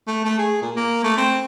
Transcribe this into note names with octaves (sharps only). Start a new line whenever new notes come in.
A3
A3
G#4
A#2
A#3
A3
C4